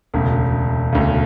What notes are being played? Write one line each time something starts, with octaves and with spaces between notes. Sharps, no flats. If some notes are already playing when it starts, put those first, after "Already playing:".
E1 D2 C#3
E1 D2 C#3